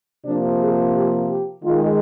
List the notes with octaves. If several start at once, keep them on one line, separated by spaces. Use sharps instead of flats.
C3 F3 A#3 D4
G#4
G4
G4
D#3 G#3 F4